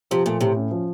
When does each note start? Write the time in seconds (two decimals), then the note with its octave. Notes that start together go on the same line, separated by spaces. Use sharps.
0.11 C3 F3
0.26 A#2 A3
0.41 A2 C3
0.57 C#4
0.71 F3